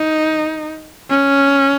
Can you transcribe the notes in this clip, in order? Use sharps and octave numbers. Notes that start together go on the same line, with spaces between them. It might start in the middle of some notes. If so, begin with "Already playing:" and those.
Already playing: D#4
C#4